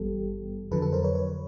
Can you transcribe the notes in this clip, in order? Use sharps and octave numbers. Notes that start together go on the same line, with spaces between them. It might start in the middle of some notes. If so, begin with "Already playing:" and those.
Already playing: G#1 G2 E3 G3 B3 G4 A4
F2 D3 F#3 A4 B4
A4 B4
A#4 C5
B4 C#5
B4 C#5